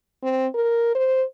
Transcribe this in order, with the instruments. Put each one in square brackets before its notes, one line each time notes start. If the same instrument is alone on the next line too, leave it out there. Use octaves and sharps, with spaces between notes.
[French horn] C4
A#4
C5